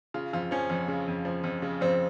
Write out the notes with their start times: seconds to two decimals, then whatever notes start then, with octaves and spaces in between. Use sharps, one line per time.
0.14 C#3 F4
0.33 F2 F4
0.51 F3 C#4
0.69 F2
0.88 C#3
1.07 F2
1.25 F3
1.44 F2
1.62 C#3
1.81 F2 C4